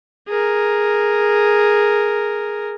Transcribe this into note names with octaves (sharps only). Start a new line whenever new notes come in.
G#4 A#4